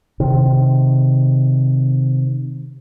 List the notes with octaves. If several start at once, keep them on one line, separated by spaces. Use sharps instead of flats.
C3 D#3